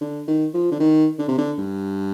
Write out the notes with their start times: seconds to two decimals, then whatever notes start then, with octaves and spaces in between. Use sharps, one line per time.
0.01 D3
0.28 D#3
0.54 F3
0.72 D3
0.80 D#3
1.19 D3
1.28 C3
1.38 D3
1.58 G2